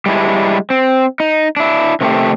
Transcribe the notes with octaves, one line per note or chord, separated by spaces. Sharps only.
G3 G#3 D4 E4
C4
D#4
D4 E4
C3 D#3 A3 G4